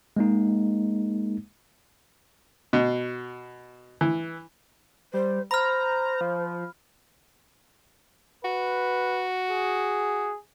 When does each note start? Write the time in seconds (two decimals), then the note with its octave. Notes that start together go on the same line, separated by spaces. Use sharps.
0.17 G#3 A#3 D#4
2.73 B2
4.01 E3
5.14 G3 C5
5.51 C5 A#5 B5 F6
6.21 F3
8.45 F#4 B4
9.51 G#4